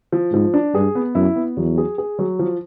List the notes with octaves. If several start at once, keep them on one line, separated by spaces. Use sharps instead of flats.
F3
G#2 F3
D4
G2 G#4
B3
F#2 E4
B3
E2 F#3
G#4
G#4
F#3
F3